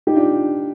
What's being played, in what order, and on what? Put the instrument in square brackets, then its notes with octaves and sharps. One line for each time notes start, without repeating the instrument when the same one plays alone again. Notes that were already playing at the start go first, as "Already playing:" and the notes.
[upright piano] D#4 G4
D4 F4